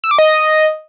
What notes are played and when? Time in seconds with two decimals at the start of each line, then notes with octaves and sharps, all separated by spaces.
0.04 E6
0.11 D6
0.19 D#5